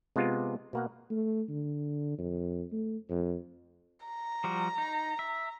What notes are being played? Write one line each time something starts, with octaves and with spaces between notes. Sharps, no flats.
C3 G#3 B3 F4
B2 A#3 F#5
A3
D3
F2
A3
F2
A#5
F3 G3 F#4
D#4
E5